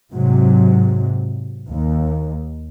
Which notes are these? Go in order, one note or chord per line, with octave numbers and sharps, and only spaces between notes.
G#2 C3 F#3
D#2